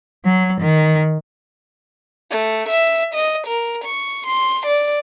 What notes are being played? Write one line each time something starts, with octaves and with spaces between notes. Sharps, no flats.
F#3
D#3
A3
E5
D#5
A#4
C#6
C6
D5